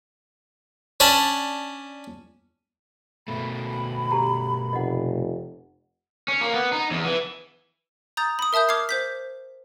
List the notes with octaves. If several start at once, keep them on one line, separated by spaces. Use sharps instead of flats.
C#4 D4 A5 B5
B2 A3 B5
G4 A5 A#5
F1 D#5 F#5
C#4
A#3
B3
D#4
E2
E3
A#5 D#6 G6 A6
B5 D#6
A#4 E5 A5 D#6 G6
D6 F6 G#6 C7
C5 G6 B6